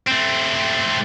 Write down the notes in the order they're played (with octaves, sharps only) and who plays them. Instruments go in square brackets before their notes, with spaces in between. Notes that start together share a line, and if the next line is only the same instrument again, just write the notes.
[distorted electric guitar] A3 C4